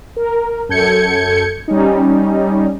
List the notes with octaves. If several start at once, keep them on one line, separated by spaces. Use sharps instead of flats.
A#4
F#2 A4 G6 G#6 C#7
G3 C#4 D#4